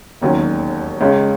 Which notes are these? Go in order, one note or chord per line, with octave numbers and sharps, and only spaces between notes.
E1 D#2 D#3 F#3 C#4
C#2 C#3 G#3 C#4